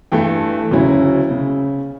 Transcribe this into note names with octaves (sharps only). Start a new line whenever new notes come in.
G2 E3 A3 G5
D2 C#3 F#3 C#4 E4
C#3